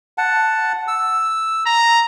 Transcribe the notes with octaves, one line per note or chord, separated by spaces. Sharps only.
F#5 A5
E6
A#5